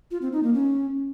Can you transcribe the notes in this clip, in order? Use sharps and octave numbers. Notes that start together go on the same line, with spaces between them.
F4
C4
D#4
A#3
C#4